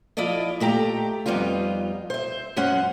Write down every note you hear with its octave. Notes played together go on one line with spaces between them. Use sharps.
F3 E4 F4 D5 D#5
A#2 A3 G4 A#5
F2 G3 B3 D#4 F4
C5 E5
F#2 G#3 C#4 C5 F#5